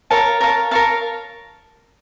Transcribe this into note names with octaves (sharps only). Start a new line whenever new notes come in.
A#4 C#5 F5 A5
A#4 C#5 F5 A5
A#4 C#5 F5 A5